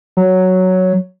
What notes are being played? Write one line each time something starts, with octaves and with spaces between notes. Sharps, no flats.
F#3